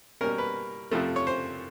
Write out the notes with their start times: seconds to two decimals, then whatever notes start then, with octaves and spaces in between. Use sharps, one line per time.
0.21 B2 G3 A#3 C#4 A#4
0.38 B4
0.91 F2 C3 F3 A3
1.16 C#5
1.27 C5